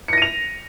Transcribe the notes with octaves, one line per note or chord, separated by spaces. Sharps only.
A#6 C#7 D#7 F7